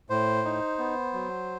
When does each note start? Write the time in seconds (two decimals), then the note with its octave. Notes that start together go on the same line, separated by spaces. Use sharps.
0.10 A2 C5
0.45 D#4
0.79 B3
1.13 F#3